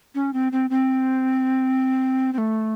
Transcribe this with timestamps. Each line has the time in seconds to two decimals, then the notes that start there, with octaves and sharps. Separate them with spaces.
0.15 C#4
0.33 C4
0.52 C4
0.70 C4
2.33 C4
2.38 A3